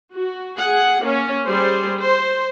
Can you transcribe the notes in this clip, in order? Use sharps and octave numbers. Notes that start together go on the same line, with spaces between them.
F#4
G#4 F#5
A#3 C#4
G3 G#4 C5
C5